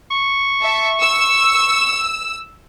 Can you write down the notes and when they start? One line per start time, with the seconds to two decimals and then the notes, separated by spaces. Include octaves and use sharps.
0.11 C#6
0.60 E5 A5
1.00 E6